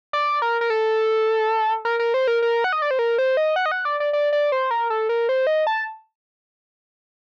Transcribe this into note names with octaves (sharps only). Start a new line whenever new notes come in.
D5
A#4
A#4
A4
A#4
A#4
C5
A#4
A#4
F#5
D#5
D5
C5
A#4
C5
D#5
F#5
D#5
F#5
D5
D5
D5
D5
C5
A#4
A4
A#4
C5
D#5
A5